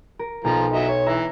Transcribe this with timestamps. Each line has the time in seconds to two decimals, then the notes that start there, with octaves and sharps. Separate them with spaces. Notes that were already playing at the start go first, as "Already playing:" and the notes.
0.19 A#4
0.45 B1 F3 A#5
0.73 F#3 D#5 E5
0.89 C#5
1.07 E3 E5 A#5